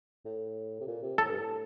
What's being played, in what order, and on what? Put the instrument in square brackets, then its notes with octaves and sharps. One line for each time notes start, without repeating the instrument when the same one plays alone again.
[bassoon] A2
C3
A#2
C3
[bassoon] A2 [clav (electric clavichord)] A4
[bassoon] G2
A2